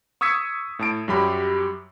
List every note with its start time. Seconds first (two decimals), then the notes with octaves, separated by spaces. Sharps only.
0.21 C#6 D#6 E6 G#6 B6 C#7
0.79 A2 A5 D7
1.08 F#2 F#3 G3 G4 B5